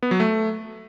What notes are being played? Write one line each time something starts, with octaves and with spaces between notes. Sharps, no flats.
B3
F#3
A3